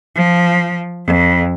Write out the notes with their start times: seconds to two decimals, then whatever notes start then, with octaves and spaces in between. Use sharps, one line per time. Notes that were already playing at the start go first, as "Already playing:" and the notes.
0.15 F3
1.05 F2